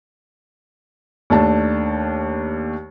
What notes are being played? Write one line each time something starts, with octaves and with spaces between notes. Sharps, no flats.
D#2 A3 D4 A5